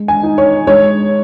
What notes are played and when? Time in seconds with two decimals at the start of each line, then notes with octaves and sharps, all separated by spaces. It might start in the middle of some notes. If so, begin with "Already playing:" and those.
Already playing: G#3
0.08 G#5
0.23 D#4
0.38 C#5
0.67 G#3 C#5